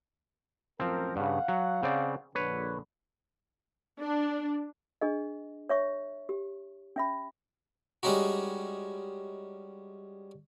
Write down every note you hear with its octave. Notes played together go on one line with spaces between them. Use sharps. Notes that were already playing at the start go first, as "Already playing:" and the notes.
A1 F#2 F3 C4 A#4
G2 C#3 F5 F#5
F#3
C#3 C4 D5
A#1 D3 B4 C#5
D4
D4 G#4 D#5
C#5 E5 C#6
G4
C#4 E5 B5
G3 G#3 C#4 D#4 F#4